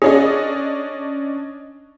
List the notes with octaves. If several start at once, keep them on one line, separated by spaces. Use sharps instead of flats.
C#4 D4 G#4 C#5 D#5